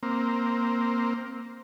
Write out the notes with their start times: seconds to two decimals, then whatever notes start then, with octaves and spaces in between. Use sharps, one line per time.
0.03 A#3 C4